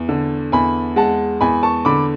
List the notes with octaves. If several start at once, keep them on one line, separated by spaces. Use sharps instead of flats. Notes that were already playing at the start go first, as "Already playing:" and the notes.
Already playing: E2
D3
E2 G#5 B5
G#3 F#5 A5
E2 G#5 B5
A5 C#6
D3 B5 D6